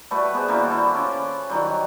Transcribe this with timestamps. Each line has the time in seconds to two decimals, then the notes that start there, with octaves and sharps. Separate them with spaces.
0.11 G3 A3 F#4 B4
0.34 B3 F#4 G#4 C5
0.48 G3 A#3 E4 F#4
0.69 E4 A4
0.94 C#4 F4 D6
1.50 D#3 F#3 G3